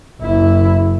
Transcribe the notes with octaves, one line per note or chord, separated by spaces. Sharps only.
F#1 E4